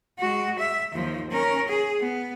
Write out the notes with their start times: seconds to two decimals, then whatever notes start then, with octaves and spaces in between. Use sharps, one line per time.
0.19 G#3 F#4
0.59 E5
0.92 D#2 F3
1.30 C#4 A#4
1.68 G#4
2.00 B3